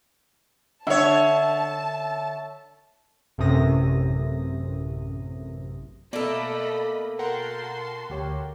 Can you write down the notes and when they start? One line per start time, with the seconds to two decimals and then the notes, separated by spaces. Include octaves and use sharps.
0.87 D3 C#5 E5 F#5 A5
3.38 A1 F#2 A2 C3 D#6 A#6
6.13 B2 A3 A#3 A4 D5 D#5 B5
7.19 F#4 A#4 F#5 G5 A5 C6
8.10 D2 G4 C#5